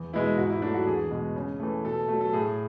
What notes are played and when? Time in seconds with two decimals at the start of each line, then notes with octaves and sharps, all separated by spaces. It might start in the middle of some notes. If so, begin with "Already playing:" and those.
Already playing: E2
0.13 B2 G#3 B3 E4
0.37 G#2 F#4
0.50 E4
0.62 F#3 A3 D4
0.74 F#4
0.87 E2 G#4
1.11 B2 G#3 B3
1.36 C#3
1.60 E3 A3
1.84 B2 A4
2.08 A3
2.13 F#3
2.21 A4
2.33 A2 G#4